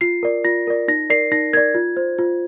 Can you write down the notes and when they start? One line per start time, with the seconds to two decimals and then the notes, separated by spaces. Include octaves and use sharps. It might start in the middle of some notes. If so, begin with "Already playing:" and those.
0.01 F4 C7
0.23 A#4 D5
0.44 F4 A#6
0.67 A#4 D5
0.88 D#4 A#6
1.10 A#4 D5 C7
1.32 D#4 A#6
1.53 A#4 D5 G#6
1.75 F4
1.97 C5
2.19 F4